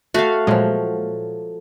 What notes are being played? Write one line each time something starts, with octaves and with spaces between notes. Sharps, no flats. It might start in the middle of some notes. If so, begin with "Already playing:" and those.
A3 F#4 F5
A#2 F3 F#3 G#3